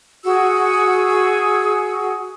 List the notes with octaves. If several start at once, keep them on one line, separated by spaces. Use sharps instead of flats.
F#4 G#4 E6